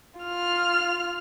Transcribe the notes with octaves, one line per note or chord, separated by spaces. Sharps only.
F4 F6